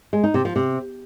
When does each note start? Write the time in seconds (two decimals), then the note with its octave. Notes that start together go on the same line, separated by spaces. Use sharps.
0.13 G#3
0.24 D#4
0.34 C3
0.45 F3
0.56 C3